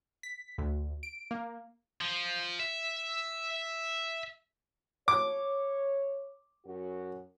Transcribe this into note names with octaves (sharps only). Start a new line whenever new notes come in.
B6
D2
D7
A#3
F3
E5
C#5 D6
F#2 F#4